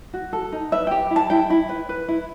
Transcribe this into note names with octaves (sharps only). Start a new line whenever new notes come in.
F#4
A4
D#4
B4 E5
G4 G5
E4
A5
E4 G5
E4
B4
B4
E4